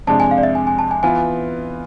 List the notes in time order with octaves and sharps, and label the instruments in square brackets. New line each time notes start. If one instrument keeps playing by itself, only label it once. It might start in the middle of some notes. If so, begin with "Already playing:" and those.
[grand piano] F2 C3 G#3 D4 [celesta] A5
[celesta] G#5
F5
D5
E5
G#5
G#5
A5
G#5
[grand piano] E3 B3 F4 [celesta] G#5